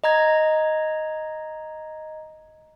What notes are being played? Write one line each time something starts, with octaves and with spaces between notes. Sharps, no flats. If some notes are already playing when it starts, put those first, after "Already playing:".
D#5 A#5 G#6